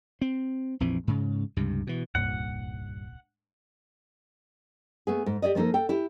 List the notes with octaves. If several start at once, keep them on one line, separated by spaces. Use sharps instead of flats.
C4
A#1 F2 E3 C4
G#2 C#3
C#2 G2 C3
B2 E3
D#1 C2 G2 A#2 F#5
A3 B3 G#4
G#2
G4 G#4 D5 D#5
F3 A#3 C#4 D#4 A4
A4 G5
E4 G4